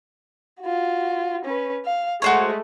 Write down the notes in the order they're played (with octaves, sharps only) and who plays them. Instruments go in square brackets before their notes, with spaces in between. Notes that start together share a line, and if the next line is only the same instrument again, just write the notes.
[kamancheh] F4 F#4
C#4 B4
F5
[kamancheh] G#3 A3 [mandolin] F#4 C5 C#5